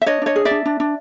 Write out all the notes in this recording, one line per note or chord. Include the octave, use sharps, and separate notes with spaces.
E5
D4 C#5 D#5
D4 C#5 D#5
G#4
D5 E5
D4
D4
D4